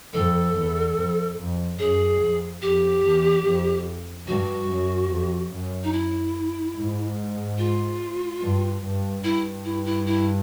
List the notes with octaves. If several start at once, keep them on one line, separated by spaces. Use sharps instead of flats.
F2 A4
E2
F2
F2
F#2 G#4
F2
F2 G4
E2
F2
G2 F#4
F#2
F2
F#2
D#4
E4
G#2
F4
G2
G2
G2 E4
E4
E4
E4